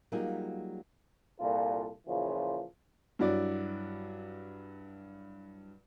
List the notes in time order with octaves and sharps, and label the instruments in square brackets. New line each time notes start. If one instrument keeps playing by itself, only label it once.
[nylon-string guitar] F#3 G3 A#3 D#4 F4 G#4
[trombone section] C2 A#2 F4 A4
A#2 C#3 E3 F3
[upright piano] G2 F#3 E4 F#4 D5